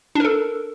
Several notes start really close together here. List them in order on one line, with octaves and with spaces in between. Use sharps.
D4 A#4 A4